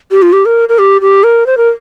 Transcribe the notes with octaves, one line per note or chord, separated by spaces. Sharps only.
G4
F4
G4
A#4
A#4
G4
G4
A#4
C5
A#4